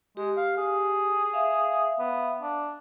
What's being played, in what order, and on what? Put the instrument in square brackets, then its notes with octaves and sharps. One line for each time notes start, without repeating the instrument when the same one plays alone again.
[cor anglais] G#3 [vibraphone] G4
[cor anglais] F5
G#4
[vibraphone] E5 F5
[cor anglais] B3
D4